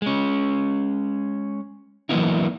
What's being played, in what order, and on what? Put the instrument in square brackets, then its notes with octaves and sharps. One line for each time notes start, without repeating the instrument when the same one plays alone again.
[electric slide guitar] G#3 C#4
E3 F#3 A#3 B3 D#4 E4